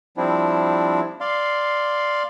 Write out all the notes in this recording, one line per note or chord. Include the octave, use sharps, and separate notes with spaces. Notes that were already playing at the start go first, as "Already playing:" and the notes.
F3 G3 C4 D4 E4
D5 F5 C6